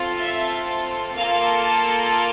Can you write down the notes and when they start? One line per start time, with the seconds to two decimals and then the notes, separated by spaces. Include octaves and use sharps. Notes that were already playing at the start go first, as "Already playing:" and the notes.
Already playing: C4 F4 A4
0.21 E5
1.16 A#3 F4 A4 F5
1.65 A5